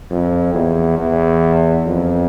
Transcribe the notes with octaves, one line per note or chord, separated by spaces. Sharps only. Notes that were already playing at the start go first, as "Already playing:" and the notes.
F2
E2
E2
F2